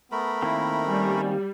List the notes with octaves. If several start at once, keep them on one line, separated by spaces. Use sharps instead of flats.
A3 B3 A#4 B5
D#3 A#3 C4 E4
G3 C#4